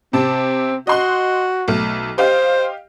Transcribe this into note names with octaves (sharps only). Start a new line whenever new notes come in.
C3 C4 A5
F#4 D#5 C6 F#6
B1 A3
G4 C5 D#5 F5